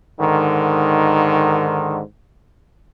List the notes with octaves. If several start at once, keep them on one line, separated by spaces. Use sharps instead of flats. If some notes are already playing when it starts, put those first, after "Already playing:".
G#2 D3 D#3